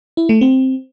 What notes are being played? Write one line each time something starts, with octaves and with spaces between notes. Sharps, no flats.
E4
A3
C4